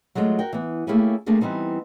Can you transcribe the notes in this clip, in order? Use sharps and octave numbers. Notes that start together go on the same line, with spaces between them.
F#3 G#3 A3 C4 F4 F#4
F#4 A#4 G5
E3 B3
A3 A#3 C#4 E4 G4 G#4
G3 A3 A#3 C4 D4 G#4
E3 G3 B3 C4 D#4